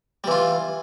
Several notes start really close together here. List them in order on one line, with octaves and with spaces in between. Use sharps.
G3 E3 F4